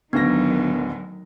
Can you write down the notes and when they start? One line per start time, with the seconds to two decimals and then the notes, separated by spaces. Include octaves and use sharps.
0.13 D1 D3 D#3 F#3 B3 A#6